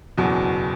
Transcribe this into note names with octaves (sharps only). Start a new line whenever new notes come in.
F#1 E2 B2 F#3